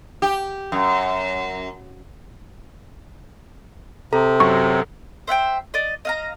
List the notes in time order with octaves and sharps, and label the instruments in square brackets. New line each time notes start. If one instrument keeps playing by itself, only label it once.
[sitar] G4
F#2
[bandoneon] C3 [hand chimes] A4 [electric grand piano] A#5
[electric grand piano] F#2 F#3 [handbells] C#6
[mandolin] C5 E5 F#5 G5
D5 D#5
D#5 F5 A#5